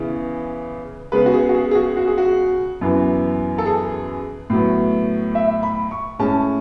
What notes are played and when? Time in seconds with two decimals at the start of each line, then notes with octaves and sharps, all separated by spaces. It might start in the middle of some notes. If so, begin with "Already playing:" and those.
Already playing: C#3 E3 B3
1.12 C#3 G#3 B3 B4
1.26 F#4
1.34 G#4
1.49 F#4
1.55 G#4
1.71 G#4
1.75 F#4
1.97 F#4
2.08 G#4
2.18 F#4
2.81 F#2 E3 B3
3.58 A4
3.66 G#4
4.50 A2 F#3 B3
5.35 E5
5.63 B5
5.91 C#6
6.19 A2 G#3 C#4 A5